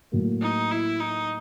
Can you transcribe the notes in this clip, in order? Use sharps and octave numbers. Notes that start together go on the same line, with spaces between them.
A2 F#3 A#3
D#4
E4
D#4